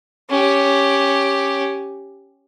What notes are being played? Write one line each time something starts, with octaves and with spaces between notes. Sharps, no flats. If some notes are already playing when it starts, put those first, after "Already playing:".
C#4 G4